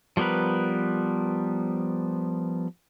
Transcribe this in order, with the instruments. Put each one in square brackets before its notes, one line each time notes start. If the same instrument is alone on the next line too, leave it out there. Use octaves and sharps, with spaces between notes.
[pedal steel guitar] F3 G3 B3 A#4 B4